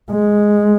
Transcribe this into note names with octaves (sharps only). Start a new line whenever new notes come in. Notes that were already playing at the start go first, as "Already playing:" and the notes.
G#3